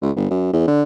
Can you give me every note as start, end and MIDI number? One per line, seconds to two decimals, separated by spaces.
0.02 0.11 37
0.16 0.30 31
0.31 0.52 42
0.53 0.66 40
0.67 0.83 50